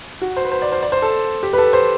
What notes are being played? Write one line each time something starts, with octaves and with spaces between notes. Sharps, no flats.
F#4
C5
B4
C5
D5
C5
D5
C5
A4
G4
B4
A4
C5